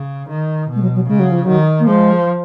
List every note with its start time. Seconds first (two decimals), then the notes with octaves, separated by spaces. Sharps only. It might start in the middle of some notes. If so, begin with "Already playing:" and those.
Already playing: C#3
0.29 D#3
0.69 B2
0.75 G#3
0.82 F#3
0.95 F#3
1.08 C#3 G#3
1.19 F#3
1.31 F3
1.43 D#3 F#3
1.79 A#3
1.86 F3 G#3